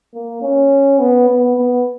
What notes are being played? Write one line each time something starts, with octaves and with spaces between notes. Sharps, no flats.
A#3
C#4
B3
B3
B3